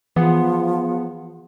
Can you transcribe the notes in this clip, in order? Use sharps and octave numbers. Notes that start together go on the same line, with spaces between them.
E3 F3 B3 G#4 F#5